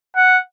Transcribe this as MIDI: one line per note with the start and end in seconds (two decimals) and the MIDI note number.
0.16 0.39 78